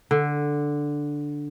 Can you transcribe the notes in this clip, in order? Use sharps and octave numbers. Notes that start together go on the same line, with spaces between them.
D3